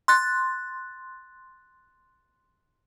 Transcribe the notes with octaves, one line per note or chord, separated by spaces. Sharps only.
C6 F#6 A6